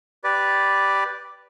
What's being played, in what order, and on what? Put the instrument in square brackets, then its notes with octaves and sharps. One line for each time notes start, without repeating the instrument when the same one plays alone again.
[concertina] G4 B4 D5